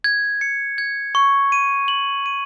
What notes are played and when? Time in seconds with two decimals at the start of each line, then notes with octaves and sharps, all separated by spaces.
0.04 G#6
0.41 C#7
0.78 G#6
1.15 C#6
1.52 D#7
1.88 F#7
2.26 D#7